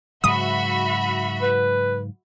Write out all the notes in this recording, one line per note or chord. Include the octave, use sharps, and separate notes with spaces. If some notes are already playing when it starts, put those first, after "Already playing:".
G#2 C#3 F#3 F#4 E5 B5 D#6
B4